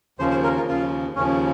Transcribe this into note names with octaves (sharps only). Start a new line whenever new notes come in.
D#2 C#3 F3 C5
C5
A#4
F4
D#2 C#3 F3 F4
D#2 C#3 F3 C#4